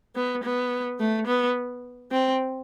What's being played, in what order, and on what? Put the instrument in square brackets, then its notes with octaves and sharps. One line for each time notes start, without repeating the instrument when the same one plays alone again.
[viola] B3
B3
A3
B3
C4